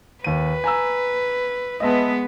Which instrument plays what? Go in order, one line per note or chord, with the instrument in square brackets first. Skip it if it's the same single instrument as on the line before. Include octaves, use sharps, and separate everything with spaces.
[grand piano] D#2 D#7 [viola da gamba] B4
[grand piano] G#5 A#5 E6
[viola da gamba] G#3 B3 B4 [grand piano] D#5 E5 A5